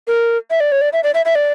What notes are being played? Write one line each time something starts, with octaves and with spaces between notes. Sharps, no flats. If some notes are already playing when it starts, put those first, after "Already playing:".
A#4
E5
D5
C#5
D5
E5
D5
E5
E5
D5